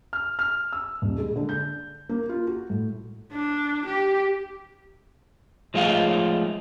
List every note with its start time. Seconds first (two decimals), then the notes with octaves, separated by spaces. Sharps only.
0.13 F6
0.39 F6
0.73 E6
1.02 D#1
1.18 G#3
1.36 D3
1.49 G6
2.09 A#3
2.29 F4
2.47 F#4
2.70 A2
3.32 D4
3.86 G4
5.74 F3 G#3 A3 F4